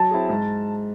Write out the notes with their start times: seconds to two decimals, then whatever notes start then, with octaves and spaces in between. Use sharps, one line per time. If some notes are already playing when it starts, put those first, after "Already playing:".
Already playing: F#3 A5
0.11 C4 E4 G#4
0.29 G#2